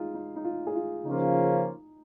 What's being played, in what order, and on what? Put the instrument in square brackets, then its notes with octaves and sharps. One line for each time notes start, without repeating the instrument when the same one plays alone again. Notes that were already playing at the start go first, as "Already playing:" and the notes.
Already playing: [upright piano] G#3 D#4 F4 G#4
D#4
D#4
F4
G#4
F4
[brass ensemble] C#3 F3 A#3 C#4 F4 [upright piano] D#4